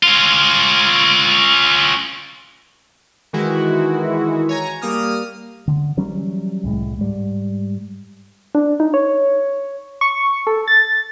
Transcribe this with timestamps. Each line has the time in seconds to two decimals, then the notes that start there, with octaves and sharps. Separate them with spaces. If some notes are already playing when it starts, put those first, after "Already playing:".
0.03 C#4 F4
3.33 D#3 E3 G#3 E4 F#4
4.49 C#5 G#5 A#5
4.82 G3 A#3 D#6 F6
5.68 D3
5.97 E3 F#3 G3 C#4
6.64 C2 A2 G#3
6.99 G#2 G3
8.55 D4
8.80 D#4
8.94 C#5
10.01 C#6
10.47 A4
10.68 A6